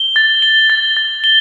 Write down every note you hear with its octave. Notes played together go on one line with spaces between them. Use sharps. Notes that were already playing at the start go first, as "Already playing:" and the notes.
Already playing: G7
A6
G7
A6
A6
G7